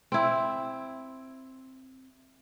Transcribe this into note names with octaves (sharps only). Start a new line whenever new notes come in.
C4 E4